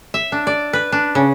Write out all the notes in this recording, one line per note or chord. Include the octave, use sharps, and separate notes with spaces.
E5
D4
D5
B4
D4
C#3